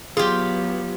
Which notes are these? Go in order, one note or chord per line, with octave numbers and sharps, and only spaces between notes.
F#3 B3 F4 G4 G#4